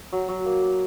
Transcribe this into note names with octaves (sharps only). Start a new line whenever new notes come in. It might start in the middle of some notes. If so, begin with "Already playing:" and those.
F#3
F#3
A#3
A#3